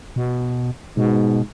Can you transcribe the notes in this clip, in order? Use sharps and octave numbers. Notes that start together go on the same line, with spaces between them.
B2
G#2 B2